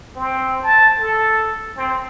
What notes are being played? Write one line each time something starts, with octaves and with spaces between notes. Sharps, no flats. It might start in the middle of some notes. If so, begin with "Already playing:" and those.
C4
A5
A4
C4